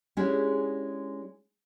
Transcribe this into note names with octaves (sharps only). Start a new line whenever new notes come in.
G#3 C#4 D4 E4 G4 G#4